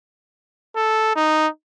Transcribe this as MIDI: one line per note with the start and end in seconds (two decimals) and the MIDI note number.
0.77 1.16 69
1.16 1.48 63